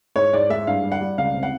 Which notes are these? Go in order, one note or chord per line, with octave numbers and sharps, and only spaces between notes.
G#2 C#5
G#2 D5
G#3 E5
G2 F5
G3
F#5
G3
C#2 F5
C3
F#5